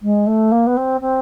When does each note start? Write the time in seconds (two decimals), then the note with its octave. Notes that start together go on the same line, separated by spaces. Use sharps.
0.02 G#3
0.26 A3
0.51 A#3
0.66 B3
0.77 C4
1.01 C4